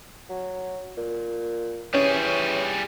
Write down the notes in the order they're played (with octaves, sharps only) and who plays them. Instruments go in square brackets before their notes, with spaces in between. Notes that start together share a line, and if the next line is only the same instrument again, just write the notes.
[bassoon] F#3
A#2
[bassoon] E3 [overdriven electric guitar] G3 G#4 [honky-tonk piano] C#4